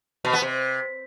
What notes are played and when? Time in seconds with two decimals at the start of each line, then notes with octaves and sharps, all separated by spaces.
0.25 B2
0.33 B3
0.42 C3